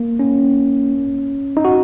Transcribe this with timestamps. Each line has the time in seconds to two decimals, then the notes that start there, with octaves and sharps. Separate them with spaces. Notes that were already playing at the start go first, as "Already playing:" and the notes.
Already playing: A#3
0.19 C#4
1.57 D#4
1.65 F#4